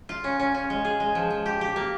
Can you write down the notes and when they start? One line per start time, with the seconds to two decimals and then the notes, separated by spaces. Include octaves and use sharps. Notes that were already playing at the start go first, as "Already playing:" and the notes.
0.09 F4
0.24 C#4
0.40 C#4
0.54 C#4
0.70 G#3
0.85 G#4
1.00 G#3
1.15 F3
1.30 F3
1.46 G4
1.61 G4
1.76 A#3